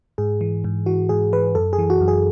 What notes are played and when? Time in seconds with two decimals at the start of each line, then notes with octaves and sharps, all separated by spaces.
0.18 G#2 G#4
0.41 E3
0.64 G#2
0.86 E3 F#4
1.09 G#2 G#4
1.33 E3 B4
1.55 F#2 A4
1.73 G#4
1.78 E3
1.90 F#4
2.01 F#2
2.08 G#4